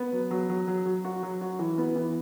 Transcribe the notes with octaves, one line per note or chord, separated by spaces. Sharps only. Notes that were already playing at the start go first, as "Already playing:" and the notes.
Already playing: B3
F#3
F#3
F#3
F#3
F#3
F#4
F#3
F#4
E3
B3
E3